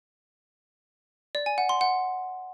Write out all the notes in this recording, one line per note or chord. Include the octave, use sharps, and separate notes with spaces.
D5
G#5
F#5
C6
F#5